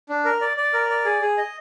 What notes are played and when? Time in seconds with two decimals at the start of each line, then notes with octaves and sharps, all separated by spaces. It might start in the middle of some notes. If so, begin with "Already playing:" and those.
0.09 D4
0.25 A#4
0.41 D5
0.57 D5
0.73 A#4
0.89 D5
1.05 G#4
1.21 G#4
1.38 D#5